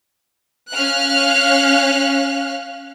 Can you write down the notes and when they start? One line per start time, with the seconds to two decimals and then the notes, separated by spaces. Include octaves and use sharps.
0.73 C#4 F5 F6 F#6